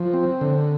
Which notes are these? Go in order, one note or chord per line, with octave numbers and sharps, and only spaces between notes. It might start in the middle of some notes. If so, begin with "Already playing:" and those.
Already playing: F3
C4
D3